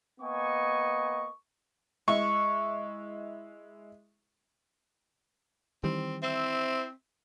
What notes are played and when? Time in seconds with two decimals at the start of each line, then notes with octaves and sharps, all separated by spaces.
0.21 A#3 B3 D#5 G#5 C#6
2.08 G#3 E4 C#6
5.84 D#3 E3 G3 C4
6.23 C4 E4 C5 E5